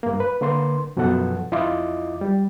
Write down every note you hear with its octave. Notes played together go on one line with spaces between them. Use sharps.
G2 A#3
B4
D3 A#3 B4 C6
F#2 B2 F3 B3 A4 F#5
F2 E4 F4 D#5 D6
G3